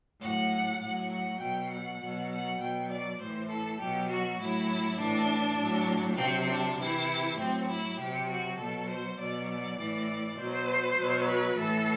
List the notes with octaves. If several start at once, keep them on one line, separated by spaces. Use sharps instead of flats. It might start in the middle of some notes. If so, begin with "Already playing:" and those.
A2 F#3 F#5
A2 F#3 F#5
F#5
B2 F#3 G5
F#5
B2 F#3
F#5
B2 G5
F#3
D5
A2 E3 C5
A4
B2 F#3 G4
F#4
A2 F#3 E4
A2 E3 D4
A2 F#3
C3 F#3 C4
D4
C3 E3 E4
A2 F#3 C4
E4
C3 F#3 G4
F#4
B2 F#3 A4
C5
B2 F#3 D5
D5
A2 E3
B2 F#3 C5
B2 F#3
B4
A2 E3 A4